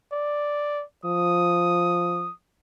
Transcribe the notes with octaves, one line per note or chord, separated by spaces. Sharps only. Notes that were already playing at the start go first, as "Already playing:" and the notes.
D5
F3 D#6